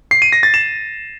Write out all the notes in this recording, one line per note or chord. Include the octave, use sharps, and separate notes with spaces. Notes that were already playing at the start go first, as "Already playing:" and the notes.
C7
D#7
A#6
A6
E7